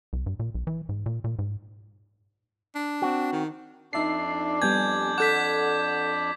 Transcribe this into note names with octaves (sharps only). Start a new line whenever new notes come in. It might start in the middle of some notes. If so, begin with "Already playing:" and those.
C2
G2
A#2
B1
E3
G#2
A#2
A#2
G#2
D4
C4 F#4
D#3
F2 D4 D#4 D5 E5 C7
G3 B3 G#5 G6 G#6
A4 F#5 D6 G6 B6